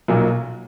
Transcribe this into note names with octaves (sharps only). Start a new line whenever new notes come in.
B1 A#2 F#3 A#3